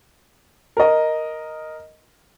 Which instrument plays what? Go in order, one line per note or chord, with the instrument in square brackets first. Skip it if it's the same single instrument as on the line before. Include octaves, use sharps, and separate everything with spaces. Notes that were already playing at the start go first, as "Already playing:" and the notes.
[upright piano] A#4 D#5